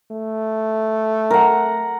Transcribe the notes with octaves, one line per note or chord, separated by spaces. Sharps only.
A3
A#4 F#5